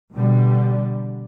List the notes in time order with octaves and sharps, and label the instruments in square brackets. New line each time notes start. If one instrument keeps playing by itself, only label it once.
[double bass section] B2 D3 G3